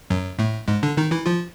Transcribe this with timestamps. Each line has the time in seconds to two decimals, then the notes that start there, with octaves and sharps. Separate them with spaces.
0.10 F#2 F#3
0.39 A2 A3
0.68 G#2 G#3
0.83 D3 D4
0.97 D#3 D#4
1.11 E3 E4
1.26 F3 F4